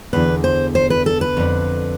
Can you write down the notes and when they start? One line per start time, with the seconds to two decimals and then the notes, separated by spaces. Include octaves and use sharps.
0.13 E2 D3 B4
0.44 C5
0.75 C5
0.90 B4
1.06 A4
1.21 B4
1.37 F2 D3